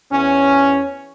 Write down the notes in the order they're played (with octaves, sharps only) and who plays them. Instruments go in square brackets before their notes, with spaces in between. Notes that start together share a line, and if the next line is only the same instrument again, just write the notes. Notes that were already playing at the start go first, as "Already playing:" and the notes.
[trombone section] E2 C#4